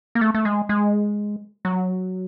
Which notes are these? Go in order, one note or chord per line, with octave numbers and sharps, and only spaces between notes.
A#3
A3
A3
G#3
G#3
F#3